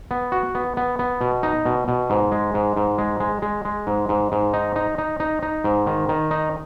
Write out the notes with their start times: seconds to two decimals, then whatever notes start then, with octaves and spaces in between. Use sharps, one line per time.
0.11 B3
0.32 F#4
0.55 B3
0.77 B3
0.99 B3
1.21 B2
1.43 D#4
1.65 B2
1.88 B2
2.10 G#2
2.32 G#3
2.54 G#2
2.76 G#2
2.98 G#3
3.20 G#3
3.42 G#3
3.65 G#3
3.87 G#2
4.09 G#2
4.32 G#2
4.54 D#4
4.76 D#4
4.98 D#4
5.20 D#4
5.43 D#4
5.64 G#2
5.87 D#3
6.09 D#3
6.31 D#4